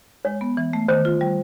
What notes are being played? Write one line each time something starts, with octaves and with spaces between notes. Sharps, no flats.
G#3 C#5
B3
E3
A3
D#3 C5
F4
G3